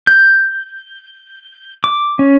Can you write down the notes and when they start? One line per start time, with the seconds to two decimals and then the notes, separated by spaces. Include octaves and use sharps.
0.07 G6
1.84 D6
2.19 C#4